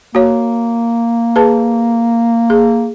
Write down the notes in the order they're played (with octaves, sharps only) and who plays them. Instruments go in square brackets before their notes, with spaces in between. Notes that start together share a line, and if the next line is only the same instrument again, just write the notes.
[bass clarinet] A#3 [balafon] F#4 C#5
[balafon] G#4 B4 A5
G#4